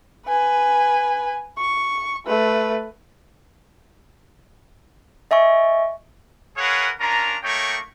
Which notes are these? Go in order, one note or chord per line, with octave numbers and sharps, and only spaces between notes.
B4 G#5
C#6
A3 B4
D#5 E5 G#5 C#6
G#4 A#4 B4 C#5 F5 F#5
C#4 D4 F4 A#4 A#5
A3 A#3 D#4 C#5 G5 C#6